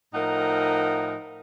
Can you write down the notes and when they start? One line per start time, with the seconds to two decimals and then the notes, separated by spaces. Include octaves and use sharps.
0.14 A2 F3 D#4 A#4 F#5